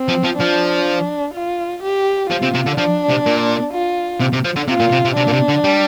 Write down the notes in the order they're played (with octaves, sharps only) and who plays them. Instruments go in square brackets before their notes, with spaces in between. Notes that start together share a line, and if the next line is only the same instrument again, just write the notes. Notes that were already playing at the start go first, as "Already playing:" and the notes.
Already playing: [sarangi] C4
[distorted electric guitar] F3
F3
[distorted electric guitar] F3 [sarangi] D4
[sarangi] F4
G4
[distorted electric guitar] F3 [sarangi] F4
[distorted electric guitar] C3
C3
D3
[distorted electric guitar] F3 [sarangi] D4
[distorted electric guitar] C3
A#2
[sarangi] F4
[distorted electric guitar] C3
C3
F3
D3
[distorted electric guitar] C3 [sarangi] F4
[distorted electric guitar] A#2
C3
C3
[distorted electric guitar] C3 [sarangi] D4
[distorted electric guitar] A#2
C3
D3
G3